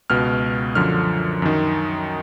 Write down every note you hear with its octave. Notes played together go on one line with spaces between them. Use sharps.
C#2 B2 F6
F#2 D3 F3 F6
F#2 D#3